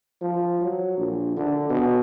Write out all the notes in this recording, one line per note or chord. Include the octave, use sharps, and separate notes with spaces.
F3
F#3
A#1
D3
B2